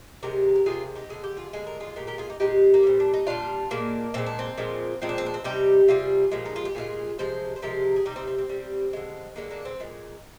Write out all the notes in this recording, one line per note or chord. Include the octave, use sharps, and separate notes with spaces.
C3 D#3 G#3 G4 A#4
A#4
C3 D#3 G#3 F4 G#4
D#4 G4
D3 G#3 G#4
G4
F4 G#4
D3 G#3 G#4
A#4
F4 G#4
A#2 G#3 G4 A#4
G4 A#4
F4 G#4
D#4 G4
A#2 G#3 D#4 G4
A#3
A#2 G3 C4
D4
D#4
A#2 G3 D4 F4
A#2 G#3 A#3 D4
A#2 G#3 C4
D4
C4
A#2 F3 G#3
A#2 F3 G#3 C4
D4
C4
D4
C4
C3 G3 D#4 G4
C3 G3 F4 G#4
A#2 F3 G#3
D#4
F4
G4
A#2 F3 G#3 F4 G#4
C3 F3 G#3 C5
C5
C3 F3 G#3 G4 A#4
G#4
C3 G3 D#4 G4
C4 D#4
C4
C4
C3 G3
D3 G#3
D3 G#3 A#3
A#3 D4
C4
A#2 G#3